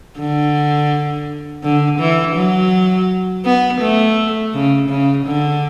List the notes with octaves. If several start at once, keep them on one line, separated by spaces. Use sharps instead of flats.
D3
D3
E3
F#3
B3
A3
C#3
C#3
D3